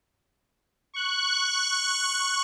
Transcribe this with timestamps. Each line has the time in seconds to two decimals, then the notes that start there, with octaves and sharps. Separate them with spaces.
0.94 C#6 F#6